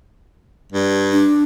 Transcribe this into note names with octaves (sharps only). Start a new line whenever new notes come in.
G2
D4